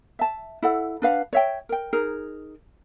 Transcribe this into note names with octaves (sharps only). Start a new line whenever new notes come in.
E5 A5
E4 A4 F#5
D4 B4 F5 F#5
C#5 E5 G5
A#4 G5
D#4 G#4 A#4